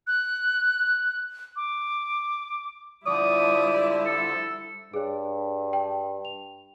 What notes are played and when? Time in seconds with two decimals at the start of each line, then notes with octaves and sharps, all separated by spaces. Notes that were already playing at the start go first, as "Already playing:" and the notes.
0.07 F#6
1.56 D6
3.06 D3 F3 G3 E4 D5 D#6
4.06 A4
4.94 G2 G#4 C#5
5.73 G5
6.25 F7